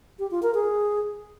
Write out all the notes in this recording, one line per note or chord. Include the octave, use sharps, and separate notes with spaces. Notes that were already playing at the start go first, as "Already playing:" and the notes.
G4
F4
A#4
G#4